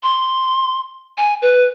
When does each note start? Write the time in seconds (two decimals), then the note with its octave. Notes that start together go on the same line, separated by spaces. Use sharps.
0.03 C6
1.18 G#5
1.42 B4